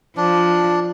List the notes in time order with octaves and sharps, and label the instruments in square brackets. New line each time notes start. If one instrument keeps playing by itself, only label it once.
[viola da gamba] F3 [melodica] D4